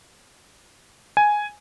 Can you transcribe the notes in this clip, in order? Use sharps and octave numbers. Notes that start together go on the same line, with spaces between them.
G#5